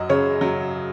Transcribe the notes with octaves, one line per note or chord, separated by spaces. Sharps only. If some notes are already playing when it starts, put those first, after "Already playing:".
Already playing: F#2 F#3 D#5
C#3 C#5
F#3